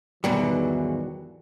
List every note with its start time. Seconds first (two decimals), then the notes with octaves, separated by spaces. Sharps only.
0.24 E2 G#2 B2 D#3 E3 F#3 G3